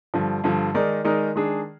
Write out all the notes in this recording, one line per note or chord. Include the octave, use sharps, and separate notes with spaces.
G2 D3 F3
G2 D3 F3
D#3 G#3 D#4 A#4 D5
D#3 G#3 D#4 A#4 D5
D#3 G#3 D4 G#4